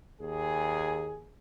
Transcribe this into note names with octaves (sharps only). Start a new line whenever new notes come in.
D#2 G#4